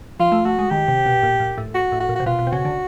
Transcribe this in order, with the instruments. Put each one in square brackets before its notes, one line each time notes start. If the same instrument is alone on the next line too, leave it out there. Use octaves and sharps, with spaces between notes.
[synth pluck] F3 [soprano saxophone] F4
[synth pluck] A3
[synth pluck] A3 [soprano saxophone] F#4
[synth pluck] G#3
[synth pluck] D#3 [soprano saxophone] G4
[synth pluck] C3
B2
A#2
A#2
A2
[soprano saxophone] F#4
[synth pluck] A2
[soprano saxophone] F#4
[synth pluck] A#2
[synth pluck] C3 [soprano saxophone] F#4
[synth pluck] B2 [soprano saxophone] F4
[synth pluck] B2
C3
[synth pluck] C#3 [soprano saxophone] F#4
[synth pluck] D3